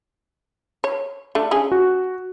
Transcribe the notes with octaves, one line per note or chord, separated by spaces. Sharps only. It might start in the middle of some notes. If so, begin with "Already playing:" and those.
C#5
A3 D4
C#4 G#4
F#4